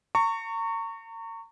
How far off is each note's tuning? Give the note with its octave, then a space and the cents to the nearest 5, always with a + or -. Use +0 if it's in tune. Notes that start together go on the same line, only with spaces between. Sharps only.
A#5 -40 C#6 +0